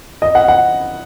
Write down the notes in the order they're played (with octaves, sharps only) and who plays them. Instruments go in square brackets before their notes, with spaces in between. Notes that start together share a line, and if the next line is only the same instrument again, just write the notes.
[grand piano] D#5
F#5
F#5